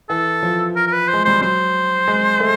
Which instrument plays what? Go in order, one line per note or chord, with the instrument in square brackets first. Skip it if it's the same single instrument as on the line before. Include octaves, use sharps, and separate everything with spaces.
[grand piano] E3 [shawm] A4
[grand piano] F3
[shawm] A#4
A#4
B4
C5
[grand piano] G#3
[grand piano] G3 [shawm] C5
[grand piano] F#3 [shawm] C5
[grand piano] G#3
A3